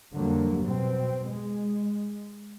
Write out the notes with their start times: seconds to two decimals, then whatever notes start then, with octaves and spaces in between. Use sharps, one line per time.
0.13 F2 D3 F#3 G3 A#3
0.64 B2 C4
1.24 G#3